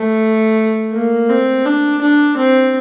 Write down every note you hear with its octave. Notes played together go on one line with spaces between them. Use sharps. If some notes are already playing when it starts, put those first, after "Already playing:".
Already playing: A3
A#3
C4
D4
D4
C4